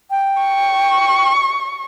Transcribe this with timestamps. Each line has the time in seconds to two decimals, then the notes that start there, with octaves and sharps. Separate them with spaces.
0.10 G5
0.43 C#6